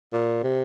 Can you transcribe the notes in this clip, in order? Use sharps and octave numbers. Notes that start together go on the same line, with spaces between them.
A#2
C3